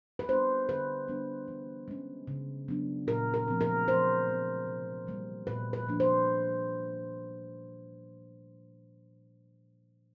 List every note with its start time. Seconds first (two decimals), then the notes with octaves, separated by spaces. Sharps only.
0.19 B4
0.28 G3 B3 D4 C5
0.69 D3 B4
1.08 G3 B3 D4
1.48 E3
1.88 G#3 C#4
2.27 C#3
2.68 F#3 B3 D4
3.07 A#2 A#4
3.34 A#4
3.48 F3 A3 C4
3.61 A#4
3.87 F3 C5
4.28 G#3 C4
4.67 C3
5.07 E3 G3 A#3
5.47 A#2 B4
5.73 B4
5.87 F3 A#3 D4
6.00 C5